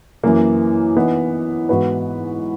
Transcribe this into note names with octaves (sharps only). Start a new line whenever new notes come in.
F#2 E3 A#3
E3 B3 D#4
G#2 E3 B3 F#4 B4